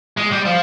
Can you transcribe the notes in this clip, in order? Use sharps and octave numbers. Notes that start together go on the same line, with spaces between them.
G#3
G3
F3